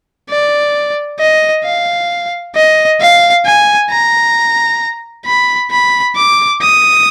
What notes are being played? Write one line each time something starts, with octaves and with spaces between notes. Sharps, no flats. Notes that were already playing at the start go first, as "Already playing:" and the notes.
D5
D#5
F5
D#5
F5
G#5
A#5
B5
B5
D6
D#6